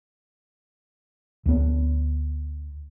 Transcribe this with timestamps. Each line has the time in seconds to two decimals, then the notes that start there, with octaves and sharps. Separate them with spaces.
1.46 D2 B3